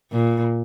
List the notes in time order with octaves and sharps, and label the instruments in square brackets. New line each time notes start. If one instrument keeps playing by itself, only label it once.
[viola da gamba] A#2